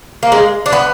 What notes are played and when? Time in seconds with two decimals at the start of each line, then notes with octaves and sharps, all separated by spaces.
0.23 A#3
0.32 G#3
0.66 D4
0.73 B3